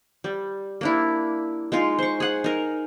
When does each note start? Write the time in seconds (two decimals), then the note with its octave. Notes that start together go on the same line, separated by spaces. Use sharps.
0.24 G3
0.81 A#3 D4 E4
1.72 G#3 D#4 F4
1.99 C5 C#6
2.20 G#4 F#5
2.44 D#4 A#4